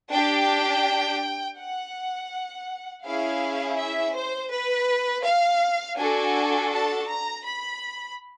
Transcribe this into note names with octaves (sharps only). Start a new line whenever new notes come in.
D4 G4 G5
F#5
C#4 E4 G#4 F5
E5
C5
B4
F5
D4 F#4 A4 G#5
A5
A#5
B5